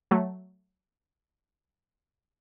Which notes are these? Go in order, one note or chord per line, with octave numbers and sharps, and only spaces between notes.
F#3 A3